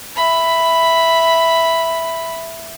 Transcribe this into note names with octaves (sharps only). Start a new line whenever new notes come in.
E5 B5